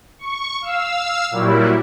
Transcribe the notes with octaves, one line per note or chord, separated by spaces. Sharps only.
C#6
F5 E6
A#2 F#3 G3 E4